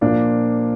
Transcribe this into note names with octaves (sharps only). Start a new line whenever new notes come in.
A#2 F3 A#3 D4